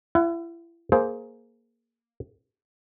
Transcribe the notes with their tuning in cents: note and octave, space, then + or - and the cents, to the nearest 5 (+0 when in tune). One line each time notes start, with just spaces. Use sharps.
E4 +35 F#5 +0
A#3 +0 G#4 +20 C5 +0